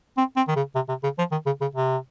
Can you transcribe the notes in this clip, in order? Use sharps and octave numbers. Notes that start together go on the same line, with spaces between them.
C4
C4
D#3
C#3
C3
C3
C#3
F3
D#3
C#3
C#3
C3